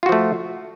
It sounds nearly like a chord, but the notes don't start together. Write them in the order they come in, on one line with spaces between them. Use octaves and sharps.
F4 F#4 F3 A3